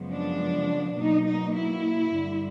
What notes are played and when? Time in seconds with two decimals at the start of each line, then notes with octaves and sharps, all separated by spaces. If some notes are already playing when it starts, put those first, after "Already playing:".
Already playing: F#2 C#3 F3 G#3 B3
0.13 D4
0.99 B2 F#3 A#3 D#4
1.27 D#4
1.57 E4
2.14 G2 D3 G3